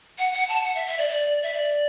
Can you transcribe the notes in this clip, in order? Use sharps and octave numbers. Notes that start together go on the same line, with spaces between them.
F#5
F#5
A5
F#5
E5
E5
D5
D5
E5
D5